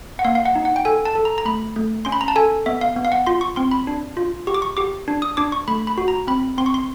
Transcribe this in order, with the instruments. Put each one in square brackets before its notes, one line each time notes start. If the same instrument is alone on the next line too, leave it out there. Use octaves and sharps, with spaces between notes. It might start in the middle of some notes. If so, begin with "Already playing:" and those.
[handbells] F#5
A#3 F5
F5
F#5
D#4
F#5
G5
A4 G#5
A5
A4
A#5
A#5
A3 B5
A3
C#4 C6
B5
A#5
A5
A4 G#5
B3 E5
F5
B3
F5
F#5
F4 C6
C#6
C4 C6
B5
D4
F4
G4 C#6
D6
C#6
G4 D6
D4
D#6
D4 D6
C#6
A3 B5
B5
F#4
A#5
C4 B5
C4 C6
C#6
C6